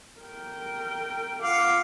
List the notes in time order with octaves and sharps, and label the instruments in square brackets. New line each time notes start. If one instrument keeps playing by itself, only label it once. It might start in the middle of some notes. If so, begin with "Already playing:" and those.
[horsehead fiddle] A#4 G5
[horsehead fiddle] F4 F#5 [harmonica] F5 D6